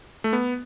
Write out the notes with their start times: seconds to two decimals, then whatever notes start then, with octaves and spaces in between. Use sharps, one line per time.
0.24 A3
0.33 B3